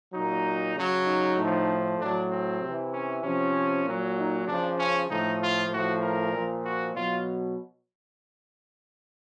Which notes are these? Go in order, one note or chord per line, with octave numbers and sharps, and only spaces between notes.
A#2 F#3 D#4
C#3 F#3
D#4
A2 F3
A2 F#3 D4
C4
C3 E3
C#4
C3 F3 C#4
A#2 F#3
D#4
C#3 F3 D4
C#4
A2 F3 D#4
F4
A2 F3 F#4
A#4
A#2 F3
F#4
B2 F#3 F4